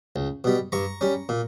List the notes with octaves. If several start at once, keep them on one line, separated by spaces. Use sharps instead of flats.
C#2
B2 G3
G2 A#5 C#6
G3 C#4
A#2